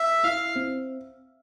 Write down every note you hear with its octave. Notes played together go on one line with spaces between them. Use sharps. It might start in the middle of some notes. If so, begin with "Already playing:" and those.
Already playing: E5
E4 F5
C4